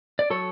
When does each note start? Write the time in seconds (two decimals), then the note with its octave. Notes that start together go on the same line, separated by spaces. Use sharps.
0.19 D5
0.30 F#3 A4 C#5